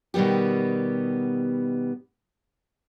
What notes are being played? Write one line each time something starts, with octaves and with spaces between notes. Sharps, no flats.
B2 D#3 G3 B3 G4